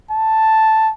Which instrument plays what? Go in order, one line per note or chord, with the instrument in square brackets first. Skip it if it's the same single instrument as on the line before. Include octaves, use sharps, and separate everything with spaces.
[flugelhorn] A5